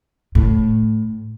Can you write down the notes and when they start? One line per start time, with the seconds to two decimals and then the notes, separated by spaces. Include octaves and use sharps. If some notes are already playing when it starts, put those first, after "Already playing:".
0.35 A2